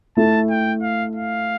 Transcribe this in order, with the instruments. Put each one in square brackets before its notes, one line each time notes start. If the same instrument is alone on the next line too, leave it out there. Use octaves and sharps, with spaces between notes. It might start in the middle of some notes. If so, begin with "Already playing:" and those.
[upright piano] A3 E4 A4 [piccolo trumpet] A5
[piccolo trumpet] G5
F5
F5